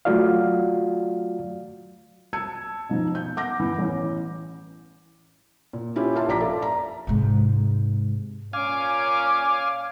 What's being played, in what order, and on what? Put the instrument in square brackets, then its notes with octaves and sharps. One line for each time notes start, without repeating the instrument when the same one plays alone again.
[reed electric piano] F#3 A3 F4 F#4 D5 F5
[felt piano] A5 E6 G#6 C#7
B2 F3 D#4
G6
F#5 D6 G6 A#6
E3 B3
A1 C#4
A#2
C#4 E4 F4 G4
E5 F5 A5 C6
A#1 F4 D5 A#5 D6 B6
A4 D5 E5
A#5
[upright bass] G#2 C3
[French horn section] A#2 C#4 [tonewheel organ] F5 G#5 [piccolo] D6